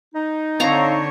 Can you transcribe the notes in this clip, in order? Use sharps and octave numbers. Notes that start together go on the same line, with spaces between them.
D#4
D3 C4 C#5 F5 A#5